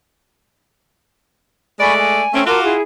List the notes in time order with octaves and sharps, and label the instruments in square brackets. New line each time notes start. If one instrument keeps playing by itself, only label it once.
[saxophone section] G#3 A3 D5 [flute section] G#5 B5 C#6
[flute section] G#5
[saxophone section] A3 C4 C#4 [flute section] C#6
[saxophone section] F4 F#4 [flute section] A#4 A5 D6
[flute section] E4 G#4